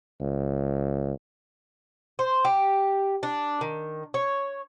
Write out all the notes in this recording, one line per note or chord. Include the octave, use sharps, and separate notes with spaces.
C#2
C5
G4
D4
D#3
C#5